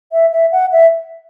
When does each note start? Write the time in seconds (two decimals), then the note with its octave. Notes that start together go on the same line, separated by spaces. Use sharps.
0.12 E5
0.32 E5
0.52 F#5
0.72 E5